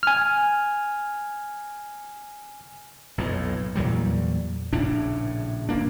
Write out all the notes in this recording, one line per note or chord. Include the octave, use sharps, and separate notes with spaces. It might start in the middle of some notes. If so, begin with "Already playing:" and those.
G#5 F6
B1 F2 A2
E2 A#2 F#3 G3
A#1 A2 C#3 D4
E1 A#3 D4